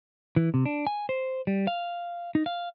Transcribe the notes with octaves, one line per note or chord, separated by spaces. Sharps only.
E3
C3
D4
G#5
C5
G3
F5
D#4
F5